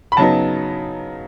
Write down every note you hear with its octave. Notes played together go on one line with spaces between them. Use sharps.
B5
C#3 F#3 B3 D#4 A5